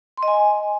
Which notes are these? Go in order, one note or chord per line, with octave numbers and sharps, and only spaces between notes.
C6
D#5
G#5